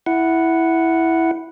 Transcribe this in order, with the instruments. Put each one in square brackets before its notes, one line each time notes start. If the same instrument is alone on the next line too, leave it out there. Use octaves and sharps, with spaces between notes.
[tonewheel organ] E4 F#5